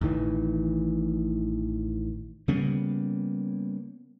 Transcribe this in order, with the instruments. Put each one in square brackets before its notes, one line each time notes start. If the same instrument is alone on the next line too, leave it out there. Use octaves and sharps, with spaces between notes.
[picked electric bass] A1 A2 D#3 E3
[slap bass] C#3 G3 A#3 B3